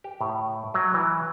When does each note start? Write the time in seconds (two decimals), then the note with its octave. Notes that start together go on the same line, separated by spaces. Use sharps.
0.04 G4
0.21 A2
0.74 F#3
0.94 E3